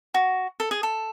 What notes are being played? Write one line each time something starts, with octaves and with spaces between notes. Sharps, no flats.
F#4
A4
G#4
A4